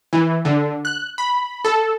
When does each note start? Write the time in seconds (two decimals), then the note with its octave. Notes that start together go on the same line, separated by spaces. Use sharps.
0.13 E3
0.45 D3
0.85 F#6
1.18 B5
1.65 A4